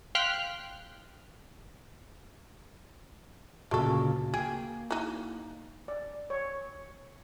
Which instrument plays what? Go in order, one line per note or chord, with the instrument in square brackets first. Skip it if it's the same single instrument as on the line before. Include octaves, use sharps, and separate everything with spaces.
[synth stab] F5 G5 C6 F6 F#6 B6
[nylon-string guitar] D2 A#2 C#3 [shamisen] G#3 A4 [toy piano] F#4 A5 C#6
[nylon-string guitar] A#3 G5 [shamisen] G#4
[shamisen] D#4 F#4 [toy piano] E4 D#5
[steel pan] D5
C#5